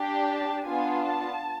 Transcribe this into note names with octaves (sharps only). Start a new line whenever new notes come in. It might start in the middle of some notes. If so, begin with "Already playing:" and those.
Already playing: D4 G4
A5
B3 D4 F4 G#5
A5